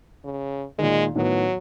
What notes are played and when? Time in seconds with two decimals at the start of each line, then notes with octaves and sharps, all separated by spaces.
0.24 C#3
0.78 A#2 D#3 G#3
1.16 A2 D#3 F#3 B3